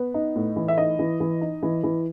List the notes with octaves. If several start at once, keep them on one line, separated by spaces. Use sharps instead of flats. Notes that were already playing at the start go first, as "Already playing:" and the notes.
Already playing: B3
D#4
A2
E3
E5
D#4 D#5
E3
E3
D#4
E3
E3